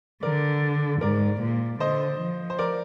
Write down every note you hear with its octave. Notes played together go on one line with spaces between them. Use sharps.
D3 A#4 D5
G#2 A#4 D5
A#2
D3 C5 D#5
F3
C5
A#4 D5